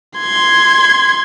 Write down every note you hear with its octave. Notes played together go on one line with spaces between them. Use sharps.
C6 G#6